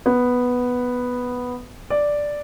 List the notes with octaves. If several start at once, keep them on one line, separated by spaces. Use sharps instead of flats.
B3
D5